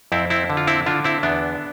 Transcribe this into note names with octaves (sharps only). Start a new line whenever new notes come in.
F2 C4 E4
C4 E4
D3
F4
C4 E4
D3 D4 F4
C4 E4
E2 B3 D4